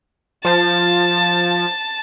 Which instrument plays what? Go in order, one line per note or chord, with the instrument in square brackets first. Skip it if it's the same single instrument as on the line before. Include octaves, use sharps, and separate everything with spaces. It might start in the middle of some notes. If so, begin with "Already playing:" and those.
[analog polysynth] F3 [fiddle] A5